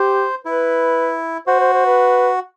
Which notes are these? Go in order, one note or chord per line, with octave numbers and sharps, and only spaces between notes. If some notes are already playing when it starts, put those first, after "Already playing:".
Already playing: G4 C5
E4 B4
F#4 C5
C5
C5
B4